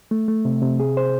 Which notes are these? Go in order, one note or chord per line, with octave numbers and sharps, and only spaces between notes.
A3
A3
C3
C3
G#4
C5